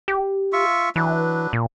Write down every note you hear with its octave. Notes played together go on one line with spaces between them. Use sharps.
G4
F4 E5 C#6
E3 F#3 D4 B4
A#2